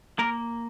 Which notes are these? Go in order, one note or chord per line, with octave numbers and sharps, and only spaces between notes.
A#3 A#4